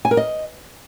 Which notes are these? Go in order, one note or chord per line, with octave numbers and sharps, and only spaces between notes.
G#5
A#4
D#5